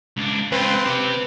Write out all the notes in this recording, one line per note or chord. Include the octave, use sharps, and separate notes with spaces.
C#2 D4
C#2 C4 F4 B4
C3 G4